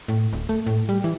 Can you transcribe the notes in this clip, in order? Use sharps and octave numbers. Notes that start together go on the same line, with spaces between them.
A2
D1
A3
A2
G3
E3